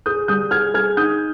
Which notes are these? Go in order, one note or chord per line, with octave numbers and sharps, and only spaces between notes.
G#4 D#6 G6
G3 D#6 G6
G#4 F6 G#6
G#4 F6 G#6
D#4 D#6 G6